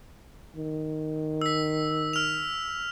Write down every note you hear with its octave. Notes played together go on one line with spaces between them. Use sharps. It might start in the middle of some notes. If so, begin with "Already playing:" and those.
D#3
E6 B6
F6 F7